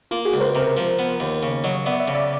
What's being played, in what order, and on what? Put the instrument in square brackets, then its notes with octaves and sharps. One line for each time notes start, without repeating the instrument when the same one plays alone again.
[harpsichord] A#3 [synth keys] F4
[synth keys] F#4 G#4
[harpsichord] C#2
[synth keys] A#4 C5
[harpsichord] C3 [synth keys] A#4 C5
[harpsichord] F3
B3
D#2
C#3
[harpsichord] F#3 [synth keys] C#5 D#5
[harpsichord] B3 [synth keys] D5 E5
[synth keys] D5 E5
[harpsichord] C#3
[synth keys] D5 E5